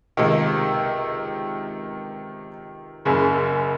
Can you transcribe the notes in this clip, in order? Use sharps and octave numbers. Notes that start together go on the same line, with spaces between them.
C#2 C3 D#3
F#1 F#2 C#3